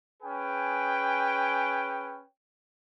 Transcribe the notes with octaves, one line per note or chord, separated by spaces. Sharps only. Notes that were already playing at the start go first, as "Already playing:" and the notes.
C#4 G#4 B4 G5